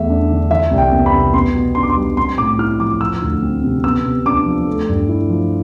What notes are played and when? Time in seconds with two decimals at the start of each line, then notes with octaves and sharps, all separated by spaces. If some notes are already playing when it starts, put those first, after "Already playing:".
Already playing: E2 A3 E5
0.09 D4
0.30 D3
0.50 E3 E5
0.71 C2
0.78 G5
0.92 B3
1.06 B5
1.13 C3
1.34 B3 C6
1.55 B2
1.75 D4 C6
1.83 D6
1.90 C6
1.96 G3
2.17 C4 C6
2.37 A2 D6
2.58 E4 F6
2.80 F3 D6
3.01 F3 E6
3.22 D2
3.42 C4
3.64 C3
3.84 B3 E6
4.05 C3
4.26 D4 D6
4.46 F3
4.67 A3
4.89 G2
5.09 E4
5.30 F3